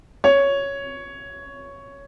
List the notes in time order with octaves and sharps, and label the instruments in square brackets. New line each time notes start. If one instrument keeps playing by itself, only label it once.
[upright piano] C#5